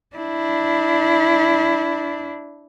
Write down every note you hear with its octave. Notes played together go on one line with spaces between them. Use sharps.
D4 E4